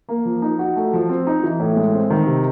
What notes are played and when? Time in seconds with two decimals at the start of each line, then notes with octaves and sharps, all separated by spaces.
0.09 A#3
0.25 F3
0.42 D#4
0.59 F#4
0.76 A3
0.93 F3
1.09 C4
1.27 D#4
1.44 E3
1.60 A2
1.76 G#3
1.94 C4
2.10 D#3
2.27 C3